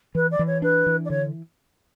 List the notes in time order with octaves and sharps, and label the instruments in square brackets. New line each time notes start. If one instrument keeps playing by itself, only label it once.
[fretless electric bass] E3 [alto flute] B4
[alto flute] D5
[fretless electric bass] E3
[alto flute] C#5
[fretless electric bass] D4 [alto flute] B4
[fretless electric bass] E3
[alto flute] D5
[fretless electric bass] D3 [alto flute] C#5